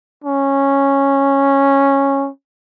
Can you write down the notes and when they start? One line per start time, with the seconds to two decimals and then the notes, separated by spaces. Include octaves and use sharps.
0.24 C#4